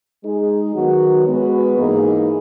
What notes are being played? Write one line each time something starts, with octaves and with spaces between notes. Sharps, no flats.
G#3 D#4 G#4
D#3 F#3 B3 F#4
G#3 B3 F#4 B4
G#2 E3 A#3 D#4 G#4